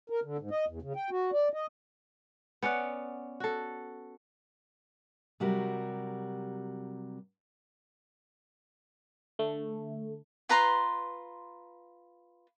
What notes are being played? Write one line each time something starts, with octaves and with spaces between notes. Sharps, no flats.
A#4
D3
G#2
D#5
E2
C#3
G5
F#4
D5
D#5
B3 C#4 D5 F#5
F#4 A4
C3 F#3 G3 F#4 A#4
D3 A3
F4 B4 A#5 C6